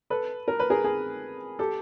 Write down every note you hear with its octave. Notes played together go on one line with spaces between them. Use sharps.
A4 B4
A#4
B4
G#4 A#4
G#4 A#4
G4 A4